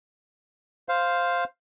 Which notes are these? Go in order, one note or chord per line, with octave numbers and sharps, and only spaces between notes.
C5 F5